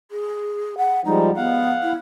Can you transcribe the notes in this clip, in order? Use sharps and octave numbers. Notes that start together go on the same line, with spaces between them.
G#4
F#5
F3 G3 G#3 D#4
B3 F5 F#5
E4